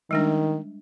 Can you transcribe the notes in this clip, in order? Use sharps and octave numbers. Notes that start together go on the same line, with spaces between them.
D#3 G3 G#3 D4